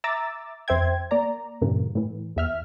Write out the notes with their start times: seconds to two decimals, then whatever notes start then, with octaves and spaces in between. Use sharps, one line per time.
0.04 E5 A#5 D6 E6 A6
0.68 F2 C5 E5 G5 G#6
1.11 A#3 D5 A#5
1.62 G2 A#2 C#3 E3
1.95 A2 E3
2.36 E2 E5 F6